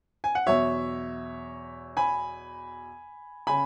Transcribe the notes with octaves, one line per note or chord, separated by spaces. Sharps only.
G#5
F#5
E2 B2 F#3 C#5 E5
G#5 B5
C#3 G#5 B5